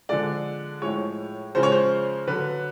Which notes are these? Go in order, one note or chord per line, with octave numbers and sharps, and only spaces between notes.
D3 F3 G#3 D5
A2 F3 G#3 C#5
C#3 F3 G#3 C5
C#5
C5
D3 F#3 B4